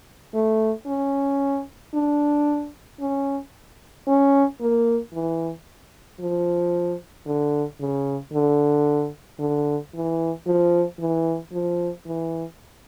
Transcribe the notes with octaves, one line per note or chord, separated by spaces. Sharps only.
A3
C#4
D4
C#4
C#4
A#3
E3
F3
D3
C#3
D3
D3
E3
F3
E3
F3
E3